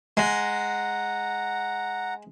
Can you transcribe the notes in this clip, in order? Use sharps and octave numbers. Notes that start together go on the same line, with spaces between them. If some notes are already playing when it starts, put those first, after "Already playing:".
G#3 F#5 A#5